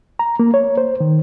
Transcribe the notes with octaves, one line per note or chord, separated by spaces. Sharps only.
A#5
A#3
C#5
C5
D#3